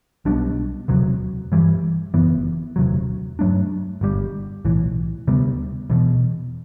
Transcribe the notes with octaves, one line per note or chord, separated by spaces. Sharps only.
B1 B2 G3 D4
E1 D2 C3 F#3
G2 E3 G3
F#1 F#2 E3 B3
E1 D2 C3 F#3
G2 F#3 A3 D4
G1 G2 D3 G3
B1 A2 E3
D2 C3 G3 B3
E1 E2 B2